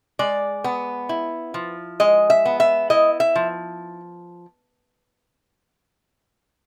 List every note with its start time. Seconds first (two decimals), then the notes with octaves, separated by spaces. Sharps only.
0.19 G#3 D5
0.64 B3
1.09 E4
1.54 F3
2.00 G#3 D#5
2.30 E5
2.45 B3
2.60 E5
2.90 E4 D#5
3.20 E5
3.35 F3